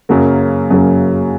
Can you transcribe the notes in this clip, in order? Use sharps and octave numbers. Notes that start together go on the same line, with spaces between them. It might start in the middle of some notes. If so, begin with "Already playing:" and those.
F#2 C#3 F#3 A#3
F#2 C#3 F#3 A#3